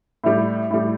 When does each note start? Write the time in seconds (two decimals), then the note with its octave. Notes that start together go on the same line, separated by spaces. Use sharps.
0.24 A2 G3
0.71 A2 G3